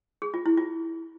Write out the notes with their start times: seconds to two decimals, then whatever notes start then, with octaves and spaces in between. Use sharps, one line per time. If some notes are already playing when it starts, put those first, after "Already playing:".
0.22 G#4
0.34 F4
0.46 E4
0.57 F4